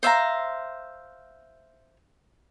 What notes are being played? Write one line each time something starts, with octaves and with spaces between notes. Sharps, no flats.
C5 E5 F5 A#5